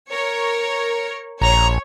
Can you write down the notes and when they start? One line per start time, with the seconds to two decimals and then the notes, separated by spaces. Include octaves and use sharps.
0.12 A#4 C#5
1.41 A#1 C#5 A#5